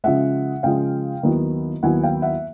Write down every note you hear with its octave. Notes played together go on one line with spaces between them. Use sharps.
C#3 F3 G#3 E5 F#5
C#3 F3 G#3 F5 G5
D#2 D#3 F#3 B3 E4
D#2 D#3 F#3 B3 E4 F#5 G#5
F5 G5
E5 F#5